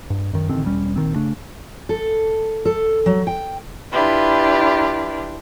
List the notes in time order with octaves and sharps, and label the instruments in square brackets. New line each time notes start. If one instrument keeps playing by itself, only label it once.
[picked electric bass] G2
F#2 D#3
A1 D3 D#3 C4
E1 G3 C#4
A#1 D#3 C4
C#3 A3 D4
[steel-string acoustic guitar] A4
A4
F#3
G5
[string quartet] D4 E4 F4 G4 B4